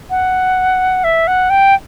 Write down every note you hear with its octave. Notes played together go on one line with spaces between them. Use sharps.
F#5
E5
F#5
G5